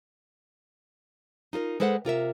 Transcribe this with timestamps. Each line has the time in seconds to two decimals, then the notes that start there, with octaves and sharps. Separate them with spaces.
1.53 D#4 F4 A4 A#4
1.80 G#3 A4 B4 C5 D#5 F#5
2.05 C3 F4 A#4 E5